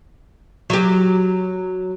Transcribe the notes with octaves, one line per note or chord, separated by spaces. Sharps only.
F#3 G4